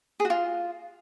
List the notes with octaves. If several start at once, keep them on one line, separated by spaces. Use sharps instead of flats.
G#4
F#4
F4